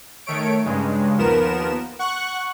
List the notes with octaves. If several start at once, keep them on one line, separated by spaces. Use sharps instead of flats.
D#3 A3 C#5 D7
G2 C#3 G#3
D#2 F3 B3 A#4 E7
F#5 C#6 F#6